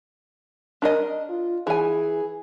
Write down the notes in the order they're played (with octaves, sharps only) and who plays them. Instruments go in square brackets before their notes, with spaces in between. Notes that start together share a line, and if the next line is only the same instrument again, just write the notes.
[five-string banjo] D4 A#4 D#5
[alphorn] F4
[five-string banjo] E3 G#5 [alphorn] G#4